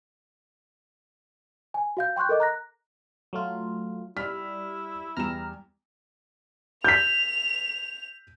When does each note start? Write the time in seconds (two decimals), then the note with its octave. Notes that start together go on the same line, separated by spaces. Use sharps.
1.74 G#5
1.97 F#4 F5 G6
2.16 G5 C6 C#6 F#6 G6
2.29 A4 A#4 D#5 D6
2.40 A#5 F#6 A#6
3.33 F#3 A3 F4
4.17 G3 E4 F6 B6
5.17 E2 G3 A#5 F6 E7
6.84 G6 B6 F7